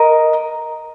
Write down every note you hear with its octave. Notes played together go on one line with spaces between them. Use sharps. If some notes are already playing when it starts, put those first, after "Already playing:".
Already playing: A#4 D#5 A#5